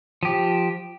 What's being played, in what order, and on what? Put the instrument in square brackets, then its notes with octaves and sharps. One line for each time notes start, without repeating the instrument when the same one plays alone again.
[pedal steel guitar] F3 G4